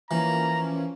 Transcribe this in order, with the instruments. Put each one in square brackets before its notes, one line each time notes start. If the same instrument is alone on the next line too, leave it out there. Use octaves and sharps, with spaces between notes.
[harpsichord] E3 [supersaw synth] F3 A#3 C#4 [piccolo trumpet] A#5